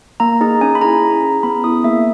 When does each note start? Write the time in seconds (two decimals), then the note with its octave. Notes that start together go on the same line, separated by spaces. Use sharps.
0.20 A#3 A#5
0.41 D#4 G#4
0.61 C#4 G#5
0.75 B5
0.81 E4 G#4 A#5
1.02 C#4
1.23 G#4
1.43 B3 B5
1.64 E4 G#4 D#6
1.84 A#3 E5